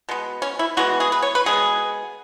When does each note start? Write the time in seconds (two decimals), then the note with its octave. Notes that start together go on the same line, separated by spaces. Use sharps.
0.09 B2 G#3 B3
0.42 C#4
0.59 E4
0.77 E3 G#3 B3 F#4
1.00 G#4
1.12 B4
1.22 C#5
1.35 B4
1.46 B2 G#3 B3 G#4